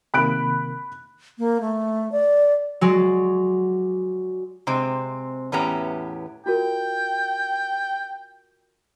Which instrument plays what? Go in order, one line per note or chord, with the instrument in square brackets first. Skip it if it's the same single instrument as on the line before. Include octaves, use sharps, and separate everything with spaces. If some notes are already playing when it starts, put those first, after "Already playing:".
[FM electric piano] C3 D#3 A#3 [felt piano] B5 F#6 D7
[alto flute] A#3
A3
D5
[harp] F#3 G#3 D5
[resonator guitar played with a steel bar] C3 G#3 C4
E2 A2 B3 C#4 G4 A#5
[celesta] F4 F#4 A#4 [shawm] G5